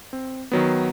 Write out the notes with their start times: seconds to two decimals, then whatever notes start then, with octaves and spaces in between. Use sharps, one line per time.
0.13 C4
0.52 D#3 F#3 B3